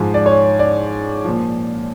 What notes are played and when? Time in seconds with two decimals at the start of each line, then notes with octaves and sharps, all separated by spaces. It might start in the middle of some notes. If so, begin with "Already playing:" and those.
Already playing: G#2 F3
0.14 D5
0.26 C#5
0.59 D5
1.24 A#2 F3